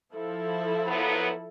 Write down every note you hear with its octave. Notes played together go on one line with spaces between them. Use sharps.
F3 E4 A4
A#2 F#3 B3